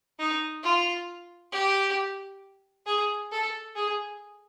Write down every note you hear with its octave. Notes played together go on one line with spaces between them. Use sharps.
D#4
F4
G4
G#4
A4
G#4